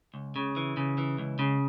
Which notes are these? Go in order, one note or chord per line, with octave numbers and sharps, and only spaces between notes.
C#2
C#3
E3
C#3
E3
C#2
C#3